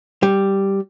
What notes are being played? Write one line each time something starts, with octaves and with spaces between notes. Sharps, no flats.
G3